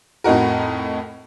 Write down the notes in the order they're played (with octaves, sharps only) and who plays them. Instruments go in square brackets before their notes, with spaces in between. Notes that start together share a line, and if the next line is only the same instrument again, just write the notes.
[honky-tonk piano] F2 A2 D#4 F#4 A#4